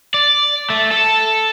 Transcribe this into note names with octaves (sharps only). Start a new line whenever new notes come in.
D5
A3
A4